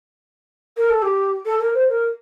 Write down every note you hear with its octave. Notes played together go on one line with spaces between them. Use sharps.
A#4
A4
G4
A4
A#4
C5
A#4